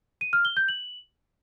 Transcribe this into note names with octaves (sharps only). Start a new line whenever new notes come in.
D#7
F6
G7
G6
F#7